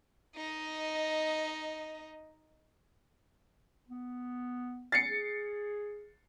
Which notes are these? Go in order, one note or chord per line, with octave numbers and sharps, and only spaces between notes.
D#4 D#5
B3
A6 C7 C#7
G#4